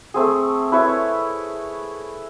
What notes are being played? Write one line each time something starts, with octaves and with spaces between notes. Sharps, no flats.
A3 C4 G#4
E4 B4 C#5 E5